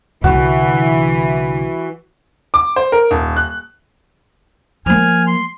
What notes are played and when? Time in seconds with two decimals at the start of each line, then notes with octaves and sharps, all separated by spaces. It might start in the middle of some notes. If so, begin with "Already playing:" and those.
0.24 C2 D3 E3 F#4
2.54 D6
2.76 C5
2.92 A#4
3.11 D#1
3.37 F#6
4.86 F3 A#3 G#5 F6
5.27 C6